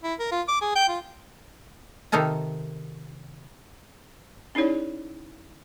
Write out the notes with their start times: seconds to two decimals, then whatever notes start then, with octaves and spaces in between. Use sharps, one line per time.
0.03 E4
0.19 A#4
0.32 F4
0.48 D6
0.62 G#4
0.75 G5
0.89 F4
2.12 C3 D#3 D#4 A4 A#4 A#5
4.55 C#4 D#4 E4 G#4 C#5 D5